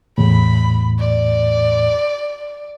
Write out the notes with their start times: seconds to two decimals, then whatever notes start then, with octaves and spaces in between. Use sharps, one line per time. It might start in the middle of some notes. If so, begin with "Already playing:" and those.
0.18 E2 A2 B5
0.99 D5